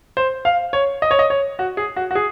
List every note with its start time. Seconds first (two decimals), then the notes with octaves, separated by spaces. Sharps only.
0.17 C5
0.45 F5
0.73 C#5
1.02 D#5
1.11 C#5
1.19 D#5
1.30 C#5
1.59 F#4
1.77 G#4
1.96 F#4
2.11 F#4
2.15 G#4